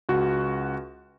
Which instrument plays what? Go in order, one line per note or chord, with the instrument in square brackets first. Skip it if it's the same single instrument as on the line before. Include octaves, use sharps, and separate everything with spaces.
[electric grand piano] C#2 F#4